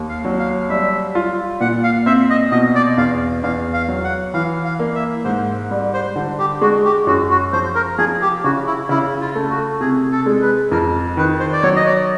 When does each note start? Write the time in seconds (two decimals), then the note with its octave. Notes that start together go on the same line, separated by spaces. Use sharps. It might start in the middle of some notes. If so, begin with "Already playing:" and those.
Already playing: D#2
0.09 F5
0.25 F#3
0.39 F5
0.70 G3 E5
1.15 F4
1.60 A#2 F#5
1.84 F5
2.06 C4 E5
2.30 D#5
2.51 B2 D#5
2.75 D5
2.98 E2 F5
3.43 E2 F5
3.73 F5
3.88 F#3
4.04 F#5
4.34 E3 F5
4.65 F5
4.79 A#3
4.95 E5
5.25 G#2 C5
5.71 G3
5.94 C5
6.16 D3
6.39 G4
6.61 G#3 F#4
6.85 G4
7.07 F#2 F#4
7.30 F#4
7.53 F3 C5
7.75 A#4
7.98 F3 G#4
8.22 G4
8.44 C#3 F#4
8.66 E4
8.89 C#3 E4
9.21 F4
9.35 A3
9.50 F#4
9.80 C3 G#4
10.12 A4
10.26 G#3
10.42 B4
10.71 F2 A#4
11.17 D#3 B4
11.40 C5
11.53 D5
11.62 F#3 C#5
11.76 D#5
11.86 D5